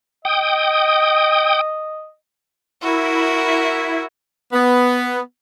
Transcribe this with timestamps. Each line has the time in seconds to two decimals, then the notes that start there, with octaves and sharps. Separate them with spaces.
0.25 D#5 G5 D#6
2.82 E4 F#4 A#4
4.53 B3